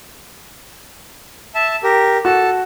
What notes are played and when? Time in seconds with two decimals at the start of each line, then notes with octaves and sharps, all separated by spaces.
1.55 E5 A5
1.83 G4 A#4
2.25 F#4 A4 A5